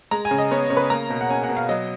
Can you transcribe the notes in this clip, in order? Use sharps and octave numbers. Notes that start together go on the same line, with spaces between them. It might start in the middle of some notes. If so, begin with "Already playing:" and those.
G#3 A#5
G#5
C#3
D#5
B3 C#5
C#3 C#5
B4
A#3 A#5
B2
F#5
C#4 G#5
F#5
B2
F5
F#3 D#5